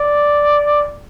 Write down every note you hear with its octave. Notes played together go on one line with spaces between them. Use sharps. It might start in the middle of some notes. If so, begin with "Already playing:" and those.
Already playing: D5